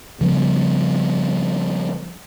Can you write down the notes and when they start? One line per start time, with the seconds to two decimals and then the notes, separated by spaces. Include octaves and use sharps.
0.21 C#3 F3 G3 B3